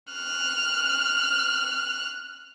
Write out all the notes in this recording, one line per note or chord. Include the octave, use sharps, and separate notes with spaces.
F6 F#6